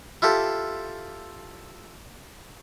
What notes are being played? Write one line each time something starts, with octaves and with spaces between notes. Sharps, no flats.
E4 F4 G4 A4